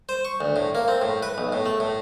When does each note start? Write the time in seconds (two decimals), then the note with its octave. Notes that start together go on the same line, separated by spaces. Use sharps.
0.09 C5
0.25 C#6
0.41 D2
0.56 A2
0.75 A#3
0.88 C4
1.02 A2
1.23 B4
1.38 B1
1.52 A2
1.66 A3
1.80 A2